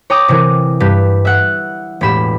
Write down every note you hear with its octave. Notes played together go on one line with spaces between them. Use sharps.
C#5 G5 A#5 D6 D#6 G6
C3 E3 A#4
G2 G4 B4
E5 F#5
E1 A2 G4 B5 E7